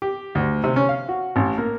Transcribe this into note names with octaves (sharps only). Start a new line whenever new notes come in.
G4
D2
C3
C#4
F5
F#4
A1
A#3